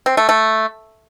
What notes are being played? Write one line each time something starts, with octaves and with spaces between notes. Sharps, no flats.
C4
A3
A3